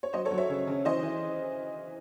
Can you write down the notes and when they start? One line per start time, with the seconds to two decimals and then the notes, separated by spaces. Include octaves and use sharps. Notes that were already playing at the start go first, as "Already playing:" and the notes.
0.03 C#5
0.13 F#3 C5 D#5
0.25 A4 C#5
0.31 F#3
0.38 C#5 E5
0.50 C#3
0.67 C#3
0.85 E3 C5 D#5
1.03 E3